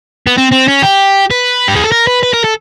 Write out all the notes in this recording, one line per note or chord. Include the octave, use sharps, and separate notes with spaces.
B3
C4
C4
C#4
G4
B4
G4
G#4
A4
A#4
B4
B4
A#4
A4